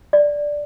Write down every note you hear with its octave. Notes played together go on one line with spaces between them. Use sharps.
D5